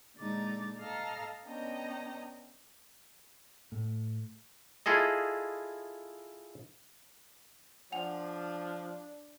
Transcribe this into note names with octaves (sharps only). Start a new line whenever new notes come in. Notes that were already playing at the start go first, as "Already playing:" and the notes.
A#2 D3 G#3 D#4 D6 A6
A4 D#5 F5 A5 A#5 F6
B3 C#4 D4 D#5 G5 A#5
A2
E4 F4 G#4 A4 D#5
F3 D4 F#5 G#5 F7